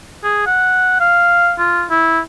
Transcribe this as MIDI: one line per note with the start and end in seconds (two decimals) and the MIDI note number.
0.24 0.44 68
0.46 0.99 78
1.00 1.53 77
1.58 1.84 65
1.90 2.20 64